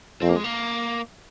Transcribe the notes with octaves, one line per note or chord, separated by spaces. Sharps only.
F2 C4
A#3
G#3
A#3